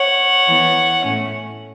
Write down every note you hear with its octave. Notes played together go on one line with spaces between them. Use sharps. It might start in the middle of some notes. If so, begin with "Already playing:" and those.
Already playing: C#5 F#5
E3 B3
A2 A3 C#4